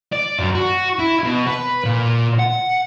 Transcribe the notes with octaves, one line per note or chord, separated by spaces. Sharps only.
D5
F#2
F#4
E4
B2
B4
A#2
F#5